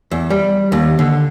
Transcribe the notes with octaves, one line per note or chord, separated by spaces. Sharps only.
E2
G3
D#2
D3